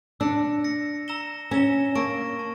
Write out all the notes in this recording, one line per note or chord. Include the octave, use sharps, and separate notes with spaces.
D4 E6 A#6 C#7
E6 A#6 C#7
A#5 E6 A#6 E7 G7
C#4 A#5 E6 A#6 E7 G7
A#3 A5 C#6 E6 A#6 D7
A5